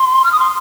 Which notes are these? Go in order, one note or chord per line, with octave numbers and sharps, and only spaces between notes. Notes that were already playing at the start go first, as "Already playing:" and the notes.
Already playing: C6
F6
D#6
C6